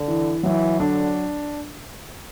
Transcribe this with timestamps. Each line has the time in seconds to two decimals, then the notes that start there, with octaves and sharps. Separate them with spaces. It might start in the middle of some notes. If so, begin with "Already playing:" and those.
Already playing: D3
0.08 E3
0.43 E3 F#3
0.80 D3 D4